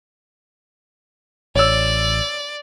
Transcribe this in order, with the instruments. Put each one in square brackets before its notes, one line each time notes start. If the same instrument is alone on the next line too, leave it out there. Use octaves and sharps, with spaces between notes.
[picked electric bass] A1 [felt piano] C#5 E6 [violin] D5